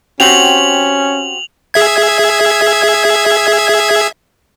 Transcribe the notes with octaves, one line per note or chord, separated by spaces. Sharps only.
C4 C#4 F#4 G4 F7 F#7
G#4 E5 G#6